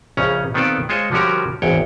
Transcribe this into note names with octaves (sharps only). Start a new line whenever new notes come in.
A#1 C#3 C#4 A#5
D#3 B3 C4 F4 A4 D5
G#3 F4 C5 C#5 D#5
D3 F3 G3 C#4 F#4 A#4
G#1 E2 C#5 G5